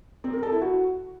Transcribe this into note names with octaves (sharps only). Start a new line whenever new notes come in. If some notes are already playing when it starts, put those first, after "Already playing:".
C4
A#4
A4
E4
F#4